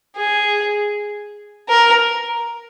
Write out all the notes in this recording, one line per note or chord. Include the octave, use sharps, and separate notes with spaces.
G#4
A#4